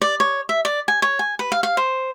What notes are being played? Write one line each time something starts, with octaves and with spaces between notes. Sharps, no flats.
D5
C#5
E5
D5
G#5
C#5
G#5
B4
F5
F5
C5